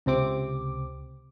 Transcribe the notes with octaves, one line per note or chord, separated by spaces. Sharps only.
C#2 C3 C4 D6